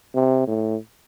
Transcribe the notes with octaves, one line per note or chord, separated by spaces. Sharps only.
C3
A2